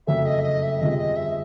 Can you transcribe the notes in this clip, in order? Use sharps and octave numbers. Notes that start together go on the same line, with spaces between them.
F#1 F2 C#3 F#3 A3 E5
D#5
D#5
E5
G1 F2 C3 F3 G#3 D#5
D#5
E5